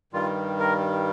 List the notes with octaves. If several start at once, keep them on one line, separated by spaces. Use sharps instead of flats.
G2 D#3 G3 F4
A#4